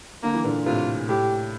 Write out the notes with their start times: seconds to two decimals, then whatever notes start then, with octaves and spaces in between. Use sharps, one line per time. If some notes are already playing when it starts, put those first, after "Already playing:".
0.23 D3 A#3
0.34 E3
0.44 A#2 D3
0.66 A2 C3 F4
1.09 A2 G4